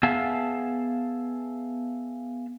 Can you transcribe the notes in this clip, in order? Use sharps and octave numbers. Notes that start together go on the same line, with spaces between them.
B3 G#4 E5 F5 A5